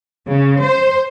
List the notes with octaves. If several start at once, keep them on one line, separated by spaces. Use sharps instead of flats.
C#3
C5